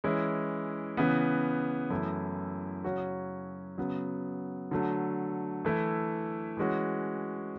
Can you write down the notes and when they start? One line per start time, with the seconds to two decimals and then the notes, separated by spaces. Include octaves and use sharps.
0.04 E3 G#3 C#4 E4
0.97 C#3 E3 B3
1.90 F#2 E3 A3 E4
2.84 C#3 F#3 C#4 F#4
3.78 C#3 F#3 B3
4.71 D3 F#3 A3
5.65 E3 A3 E4
6.57 E3 G#3 C#4 F#4